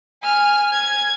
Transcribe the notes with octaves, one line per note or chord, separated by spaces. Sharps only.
G#5 F6
G#6